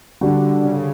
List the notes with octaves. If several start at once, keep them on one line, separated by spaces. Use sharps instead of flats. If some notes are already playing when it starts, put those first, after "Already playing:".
D3 G3 D4 F#4
D3
C#3
C#3